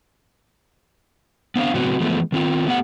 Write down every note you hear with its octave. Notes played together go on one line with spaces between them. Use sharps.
B3 C4 D4 F5
A2 C#3 F#3 B3 C4 F#4
E3 F3 G#3 A3 B3
D#3 C4 F4
A3 B3 G4 F#5